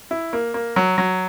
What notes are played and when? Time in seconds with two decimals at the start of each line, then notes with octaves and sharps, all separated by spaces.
0.11 E4
0.33 A#3
0.54 A#3
0.76 F#3
0.98 F#3